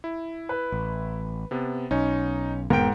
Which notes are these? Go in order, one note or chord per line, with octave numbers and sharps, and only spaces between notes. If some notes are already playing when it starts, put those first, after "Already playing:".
E4
B4
A1
C3 B3
B1 C#4 D#4
E1 G#2 B3 A#4 G5 D7